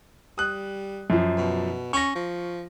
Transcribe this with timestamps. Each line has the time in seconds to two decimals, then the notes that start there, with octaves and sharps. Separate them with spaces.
0.38 G3 D#6 F#6
1.10 F#2 F3
1.38 B2
1.93 C#4 C#6 A#6
2.15 F3